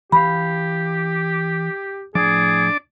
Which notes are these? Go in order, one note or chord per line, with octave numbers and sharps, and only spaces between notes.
E3 G4 F5 B5
A2 F3 D4 G#4 D5